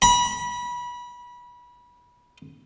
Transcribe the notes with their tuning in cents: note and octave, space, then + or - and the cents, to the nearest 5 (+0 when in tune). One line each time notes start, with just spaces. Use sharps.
B5 -25